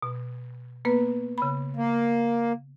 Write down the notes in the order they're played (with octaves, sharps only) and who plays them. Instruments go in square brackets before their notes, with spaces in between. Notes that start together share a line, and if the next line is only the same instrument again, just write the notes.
[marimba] B2
A#3 B3 B4
C#3 B5
[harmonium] A#3